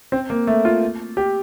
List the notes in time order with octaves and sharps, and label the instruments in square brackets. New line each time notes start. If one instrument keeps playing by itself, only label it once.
[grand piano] C4
A#3
A3
F4
G4